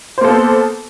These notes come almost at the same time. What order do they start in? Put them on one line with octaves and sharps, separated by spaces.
C5 A#3 A4 B3